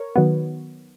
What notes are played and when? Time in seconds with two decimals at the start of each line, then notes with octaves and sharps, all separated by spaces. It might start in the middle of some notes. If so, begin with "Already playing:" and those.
Already playing: A#4 C#5
0.16 D#3 F#3 B3